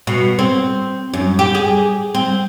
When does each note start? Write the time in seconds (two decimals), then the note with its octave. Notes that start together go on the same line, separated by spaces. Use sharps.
0.07 B2
0.39 C4
1.13 F#2
1.39 G4
1.55 G#4
2.15 C4